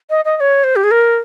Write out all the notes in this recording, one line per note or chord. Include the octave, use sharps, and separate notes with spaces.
D#5
D#5
D#5
C#5
C5
G4
G#4
A#4